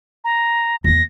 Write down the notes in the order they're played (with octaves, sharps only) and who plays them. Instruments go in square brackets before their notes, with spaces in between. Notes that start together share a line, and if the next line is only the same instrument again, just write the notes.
[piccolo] A#5
[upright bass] E2 B3 [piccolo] A#6